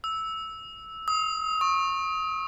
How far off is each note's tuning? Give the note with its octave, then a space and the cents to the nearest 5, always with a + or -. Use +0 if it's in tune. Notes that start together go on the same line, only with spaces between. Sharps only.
E6 -10
D#6 +30
C#6 -25